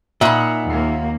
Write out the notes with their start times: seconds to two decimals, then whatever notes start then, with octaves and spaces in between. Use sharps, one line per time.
0.21 A#2 D#4 F4 E5 F#5 B5
0.66 D#2 A#3